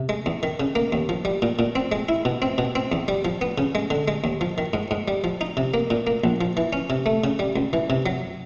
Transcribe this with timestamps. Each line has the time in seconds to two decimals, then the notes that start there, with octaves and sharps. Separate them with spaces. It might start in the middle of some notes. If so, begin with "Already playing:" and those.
Already playing: C3
0.09 G#3
0.26 E2
0.43 D#3
0.60 C#3
0.75 A#3
0.92 D#2
1.09 F3
1.25 G3
1.42 A#2
1.59 A#2
1.76 C4
1.92 G#3
2.09 E4
2.25 B2
2.42 C4
2.58 B2
2.75 C4
2.92 E2
3.08 G3
3.25 F3
3.41 B3
3.58 C#3
3.75 G#3
3.90 D3
4.08 G#3
4.24 D#2
4.41 F3
4.58 D#3
4.73 G#2
4.91 G#2
5.08 G3
5.24 F3
5.41 D#4
5.57 C3
5.74 A#3
5.90 A#2
6.07 A#3
6.24 A#1
6.41 F3
6.57 E3
6.73 C#4
6.90 C3
7.06 A3
7.24 C#3
7.39 G3
7.56 C#2
7.73 E3
7.90 C3
8.06 F#3